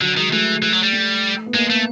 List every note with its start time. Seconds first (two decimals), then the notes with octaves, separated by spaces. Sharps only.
0.01 D3 F#3
0.17 D#3 G#3
0.32 E3 A3
0.62 E3
0.73 F#3
0.83 G3
0.93 A3
1.46 B3
1.54 G#3 A#3
1.70 A3